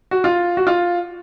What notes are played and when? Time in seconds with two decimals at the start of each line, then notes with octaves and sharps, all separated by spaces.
0.11 F#4
0.24 F4
0.57 F#4
0.67 F4